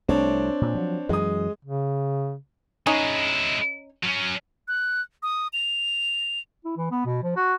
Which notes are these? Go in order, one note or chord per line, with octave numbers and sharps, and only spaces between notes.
C2 A3 C4 D4 C#5
A#2
F3 F#3
F#2 E3 F#3 G#3 D#6
C#3
G#3 C#4 D#4 E4
F#3 C#4
F#6
D#6
F7
E4
E3
B3
B2
F3
F#4